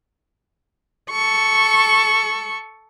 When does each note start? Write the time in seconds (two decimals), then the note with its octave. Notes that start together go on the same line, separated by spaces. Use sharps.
1.10 A4 C#6